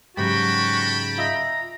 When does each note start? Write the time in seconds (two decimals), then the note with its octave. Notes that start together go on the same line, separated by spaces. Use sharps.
0.17 G#2 C#3 F#3 F#4 G4 G5 A5 B5
1.18 F4 D#5 E5 A#5